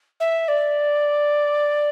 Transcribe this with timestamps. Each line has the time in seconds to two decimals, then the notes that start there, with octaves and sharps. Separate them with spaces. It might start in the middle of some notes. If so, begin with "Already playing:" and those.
0.20 E5
0.48 D5